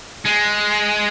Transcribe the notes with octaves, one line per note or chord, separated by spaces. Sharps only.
G#3